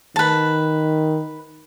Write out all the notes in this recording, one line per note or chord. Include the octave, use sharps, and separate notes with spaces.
D#3 B4 A5